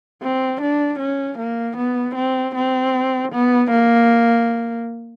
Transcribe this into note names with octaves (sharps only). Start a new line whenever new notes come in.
C4
D4
C#4
A#3
B3
C4
C4
B3
A#3